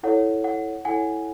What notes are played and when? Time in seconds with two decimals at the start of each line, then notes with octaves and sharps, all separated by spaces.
0.03 E4 A4 C#5 F#5
0.44 F#5
0.85 E4 A4 C#5 F#5 G#5